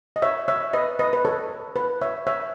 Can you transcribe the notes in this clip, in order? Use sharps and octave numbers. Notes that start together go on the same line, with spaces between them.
D#5
C#5 E5
C#5 E5
B4 D#5
B4 D#5
B4
A4 C#5
B4
C#5 E5
C#5 E5